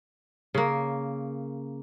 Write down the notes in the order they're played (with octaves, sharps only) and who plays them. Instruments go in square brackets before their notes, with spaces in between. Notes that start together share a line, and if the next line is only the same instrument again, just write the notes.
[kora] C#3 A#3